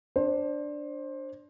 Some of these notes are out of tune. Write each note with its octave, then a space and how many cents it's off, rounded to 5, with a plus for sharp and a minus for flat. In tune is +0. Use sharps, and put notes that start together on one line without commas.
D4 +0 C5 +20